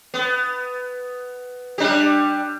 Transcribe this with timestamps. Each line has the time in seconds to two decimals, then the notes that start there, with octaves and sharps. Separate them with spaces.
0.14 B3
1.78 G3 D4 G4